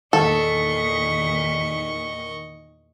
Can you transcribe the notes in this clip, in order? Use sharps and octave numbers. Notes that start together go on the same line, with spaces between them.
E2 A#2 D#3 A4 D#5 C#6